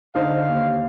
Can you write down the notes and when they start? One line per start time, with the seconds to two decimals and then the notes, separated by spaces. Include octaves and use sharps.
0.15 D3 D#4 C5 F5
0.48 D#2